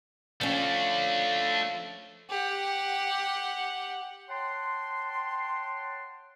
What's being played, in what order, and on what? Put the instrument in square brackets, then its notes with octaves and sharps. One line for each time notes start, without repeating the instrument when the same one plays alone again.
[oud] F3 C#4 [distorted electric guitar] A3 D4
[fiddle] G4 F#5
[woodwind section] C#5 F#5 G5 A5 C6